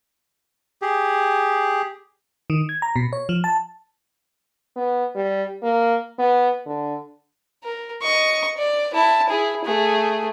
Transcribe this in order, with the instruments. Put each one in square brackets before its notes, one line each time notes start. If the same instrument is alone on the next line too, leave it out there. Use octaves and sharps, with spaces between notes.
[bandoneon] G4 G#4
[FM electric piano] D#3
G#6
A#5
B2
C#5
F3
A5
[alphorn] B3
G3
A#3
B3
D3
[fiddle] A#4
D#5 C#6
D5
E4 A5
E4 G#4
A3 G#4